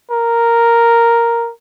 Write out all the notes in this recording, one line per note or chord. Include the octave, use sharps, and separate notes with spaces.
A#4